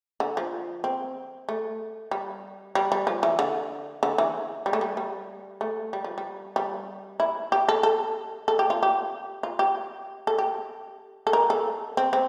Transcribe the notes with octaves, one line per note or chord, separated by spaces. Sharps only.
D3
F3
C4
A3
G3
G3
G3
F3
E3
D3
D3
E3
G3
A3
G3
G3
A3
G3
F3
G3
G3
E4
G4
A4
A4
A4
G4
F4
G4
F4
G4
A4
G4
A4
A#4
A4
C4
C4